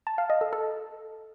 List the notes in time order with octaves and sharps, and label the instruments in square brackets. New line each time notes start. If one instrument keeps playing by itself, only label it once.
[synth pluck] A5
F5
D#5
A4
A4